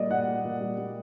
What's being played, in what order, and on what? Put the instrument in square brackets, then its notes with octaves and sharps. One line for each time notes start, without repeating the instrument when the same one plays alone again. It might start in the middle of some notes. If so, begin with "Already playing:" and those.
Already playing: [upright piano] A#2 G3 A#3 [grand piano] D5 D#5
[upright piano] A#2 [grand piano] F#5
[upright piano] A#3
A#2
G3
G3